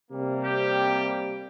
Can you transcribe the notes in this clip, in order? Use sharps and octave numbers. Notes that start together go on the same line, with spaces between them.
C3 G3 A#3
G4